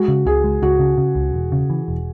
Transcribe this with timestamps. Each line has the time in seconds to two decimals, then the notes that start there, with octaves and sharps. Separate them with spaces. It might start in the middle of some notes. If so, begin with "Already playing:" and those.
Already playing: G#3 F#4
0.08 C#3
0.26 C#2 G#4
0.44 G#3
0.62 C#2 F#4
0.79 C#3
0.97 C#3
1.15 C#2
1.34 E1
1.52 C#3
1.70 E3
1.88 E1